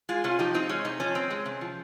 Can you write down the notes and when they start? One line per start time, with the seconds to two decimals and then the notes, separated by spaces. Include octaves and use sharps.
0.09 G#3 F4 G#4
0.24 C3 C#4 F4
0.39 F3 D#4 G4
0.54 C4 D#4
0.69 G#3 C#4
0.85 C3 D#4
1.00 F3 C#4
1.15 C4
1.31 G#3
1.46 C3
1.61 F3